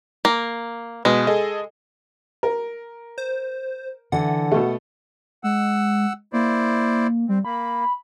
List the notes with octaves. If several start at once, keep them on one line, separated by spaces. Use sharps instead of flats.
A#3
B2 G#3 B4
G#4 A4 D#5
A#4
C5
D3 E3 F#5
B2 A3
G#3 F#5 E6
A#3 E4 C5 D5
G3 C4
A#3 B5